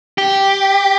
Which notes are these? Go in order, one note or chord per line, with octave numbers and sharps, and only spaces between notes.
G4